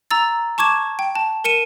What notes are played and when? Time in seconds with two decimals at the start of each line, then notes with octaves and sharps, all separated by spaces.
0.11 A#5 E6 A6
0.58 A5 C#6 D6 G#6 E7
0.99 G5
1.16 A5
1.44 A#4 C#7 D#7 E7